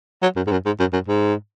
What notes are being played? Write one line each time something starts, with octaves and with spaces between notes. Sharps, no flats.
F#3
F#2
G#2
F#2
G#2
F#2
F#2
G#2